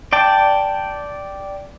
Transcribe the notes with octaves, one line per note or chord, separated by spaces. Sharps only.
D5 G5 A5